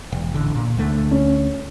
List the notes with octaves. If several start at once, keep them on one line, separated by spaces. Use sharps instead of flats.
E1
A1 D3
A#2
D2 D3 A3
C#4